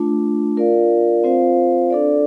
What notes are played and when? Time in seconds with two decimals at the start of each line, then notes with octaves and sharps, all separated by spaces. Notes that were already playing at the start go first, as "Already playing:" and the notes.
Already playing: A3 D4 F4
0.57 F4 A#4 D5 F5
1.24 C4 F4 C5 F5
1.90 D4 A4 D5